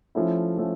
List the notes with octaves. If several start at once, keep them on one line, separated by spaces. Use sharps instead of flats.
F3 A3 C#4 E4
F3 A3 C#4